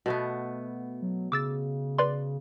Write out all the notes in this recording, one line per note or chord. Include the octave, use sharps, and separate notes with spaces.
B2 A3 B3
F#3
C#3 D6 E6 A6
B4 D5 C6